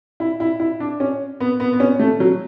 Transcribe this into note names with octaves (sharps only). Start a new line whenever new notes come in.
E4
E4
E4
D4
C#4
B3
B3
B3
C#4
A3
F#3